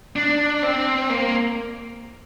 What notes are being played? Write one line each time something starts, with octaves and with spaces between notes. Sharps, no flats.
D4
C4
A#3